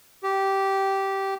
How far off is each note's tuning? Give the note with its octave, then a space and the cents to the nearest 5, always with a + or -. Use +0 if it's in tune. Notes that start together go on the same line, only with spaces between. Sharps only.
G4 -15